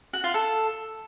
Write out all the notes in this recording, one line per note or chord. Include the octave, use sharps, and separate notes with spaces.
F#4
F4
A4